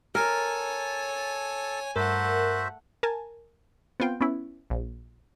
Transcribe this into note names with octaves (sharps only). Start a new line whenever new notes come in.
A4 A#4 C#5 G#5 A5
G2 A3 F#4 A#4 C5 E5 F#5
A#4 G#5 A5
B3 C4 F4 G5
B3 C#4 E4
A#1